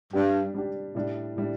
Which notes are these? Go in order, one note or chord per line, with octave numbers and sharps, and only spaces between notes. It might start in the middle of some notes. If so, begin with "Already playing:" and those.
G2 G3 D4 G4
G3 D4 G4
A2 G3 D4
A2 G3 D4